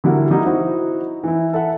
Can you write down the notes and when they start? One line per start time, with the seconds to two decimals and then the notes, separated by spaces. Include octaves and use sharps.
0.04 D3 G3 E4 F#4 A#4
0.31 G3 D#4 E4 F#4
0.46 D#4 E4 F#4 C5
1.24 E3 E4
1.53 A4 E5 F#5